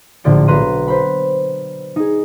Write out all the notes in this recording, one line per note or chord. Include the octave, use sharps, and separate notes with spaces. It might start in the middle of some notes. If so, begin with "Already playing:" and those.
A#1 A2 D3 D5 G6 D7
B1 B4 A#5 C6 F#6 D#7
B4 C5 B5
D#4 G#4